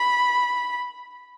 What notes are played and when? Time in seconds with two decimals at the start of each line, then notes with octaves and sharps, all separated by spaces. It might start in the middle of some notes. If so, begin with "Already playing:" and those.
Already playing: B5